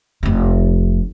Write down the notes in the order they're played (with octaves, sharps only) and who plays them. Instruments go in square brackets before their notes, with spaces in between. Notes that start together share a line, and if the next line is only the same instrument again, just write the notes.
[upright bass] F1 C3